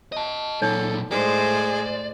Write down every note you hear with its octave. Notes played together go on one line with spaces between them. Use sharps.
D#5 A5
A#2 F#3 D#4 A4 C#5
A2 G#3 G#4 C5 D5